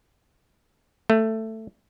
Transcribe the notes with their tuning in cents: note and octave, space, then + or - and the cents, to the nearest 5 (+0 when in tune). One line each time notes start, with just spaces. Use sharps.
A3 +10